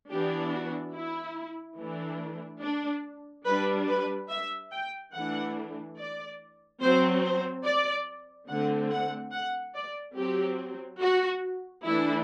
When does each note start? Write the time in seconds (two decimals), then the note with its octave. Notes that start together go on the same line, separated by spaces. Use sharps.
0.11 E3 B3 D4 G4
0.53 F#4
0.95 E4
1.79 E3 A3 D4
2.63 D4
3.46 G3 D4 B4
3.88 B4
4.30 E5
4.72 G5
5.14 E3 A3 D4 F#5
5.98 D5
6.82 F#3 C4 C5
7.24 C5
7.65 D5
8.49 D3 A3 C4 F#5
8.91 F#5
9.33 F#5
9.75 D5
10.17 F#3 C4 G4
11.01 F#4
11.85 E3 A3 D4 E4